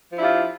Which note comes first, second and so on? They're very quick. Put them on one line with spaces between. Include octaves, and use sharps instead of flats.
F3 D4 E4 G4 F4